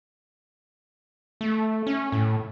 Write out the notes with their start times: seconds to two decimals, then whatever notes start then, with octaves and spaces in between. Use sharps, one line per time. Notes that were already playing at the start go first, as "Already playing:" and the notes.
1.41 A3
1.87 C#4
2.12 A2